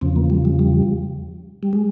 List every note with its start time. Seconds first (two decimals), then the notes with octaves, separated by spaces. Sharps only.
0.01 E2 C#3 F3 C4
0.16 A#3
0.30 G3
0.45 G3
0.59 G3
1.63 G3
1.73 G#3